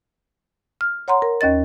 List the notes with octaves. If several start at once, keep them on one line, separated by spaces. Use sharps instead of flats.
F6
C#5 F#5 A#5 C6
A#4
D#2 C#4 D#5 A6